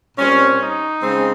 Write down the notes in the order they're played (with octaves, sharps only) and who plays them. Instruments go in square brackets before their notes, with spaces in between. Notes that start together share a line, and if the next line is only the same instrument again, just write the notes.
[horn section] A#2 G3 C4 C#4
D#4
C#3 G#3 C4